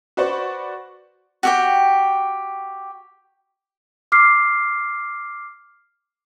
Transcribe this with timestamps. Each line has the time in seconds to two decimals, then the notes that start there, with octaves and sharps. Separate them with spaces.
0.17 F#4 B4 C5 D5 F#5 C#6
1.43 F#4 G4 G5
4.12 D6 F6 C7